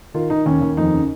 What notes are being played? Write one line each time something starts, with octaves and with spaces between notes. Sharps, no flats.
D#3 F4
D#3 D#4
D#2 C#4
D#2
F2 D#4
C#3